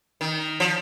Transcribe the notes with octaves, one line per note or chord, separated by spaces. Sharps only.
D#3
F3